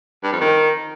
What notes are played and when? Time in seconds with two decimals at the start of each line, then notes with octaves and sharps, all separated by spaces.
0.23 G2
0.32 F2
0.41 D#3